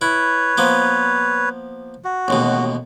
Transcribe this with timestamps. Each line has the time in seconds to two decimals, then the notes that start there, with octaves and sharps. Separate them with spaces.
0.01 E4 B4 C#5
0.57 F3 A#3 B3
2.04 F#4
2.28 A1 D#2 B2